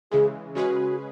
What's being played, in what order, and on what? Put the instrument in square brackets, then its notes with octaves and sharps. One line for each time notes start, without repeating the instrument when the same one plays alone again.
[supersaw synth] C#3 E3 G#3 [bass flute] G#4
[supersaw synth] C#3 G#3 C#4 G#4 B4 [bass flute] F#4